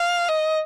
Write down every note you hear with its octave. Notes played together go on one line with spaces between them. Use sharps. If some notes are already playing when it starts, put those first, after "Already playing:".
Already playing: F5
D#5